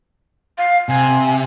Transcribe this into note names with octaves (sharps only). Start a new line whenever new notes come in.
F5
C3 G#5